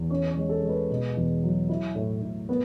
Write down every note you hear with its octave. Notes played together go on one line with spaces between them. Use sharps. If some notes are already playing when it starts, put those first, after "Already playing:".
Already playing: E2
C#4 C#5
C#5
G#3
A4
G#3
B4
B2
E2
F#3
E4
A2
A2
B3